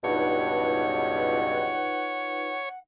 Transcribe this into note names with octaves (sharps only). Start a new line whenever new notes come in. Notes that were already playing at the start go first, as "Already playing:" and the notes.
C#2 G2 B2 D#4 F4 B4 C#5 F#5